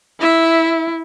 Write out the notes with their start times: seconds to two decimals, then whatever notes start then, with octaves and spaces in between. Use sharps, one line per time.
0.21 E4 E5